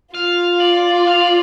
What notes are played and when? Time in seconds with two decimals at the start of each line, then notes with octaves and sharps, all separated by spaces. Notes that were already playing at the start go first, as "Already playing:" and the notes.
0.14 F4 F5
0.60 D5
1.07 F5
1.20 D5